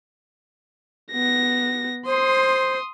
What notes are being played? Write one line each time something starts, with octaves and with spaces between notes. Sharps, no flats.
B3 A#6
C5 C6 D#6